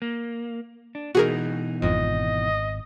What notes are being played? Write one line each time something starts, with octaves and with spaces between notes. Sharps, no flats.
A#3
D4
B2 E3 D#4 F#4 G#4 A#4
G#1 F2 D#5